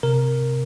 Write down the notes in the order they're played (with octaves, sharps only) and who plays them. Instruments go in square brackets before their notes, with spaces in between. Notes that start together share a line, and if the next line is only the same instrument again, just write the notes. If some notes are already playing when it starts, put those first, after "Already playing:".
[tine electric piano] C3 A#4